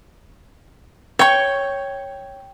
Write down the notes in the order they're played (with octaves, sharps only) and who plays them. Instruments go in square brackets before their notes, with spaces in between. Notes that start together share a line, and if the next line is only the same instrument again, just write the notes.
[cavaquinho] C#5 C#6 [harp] G5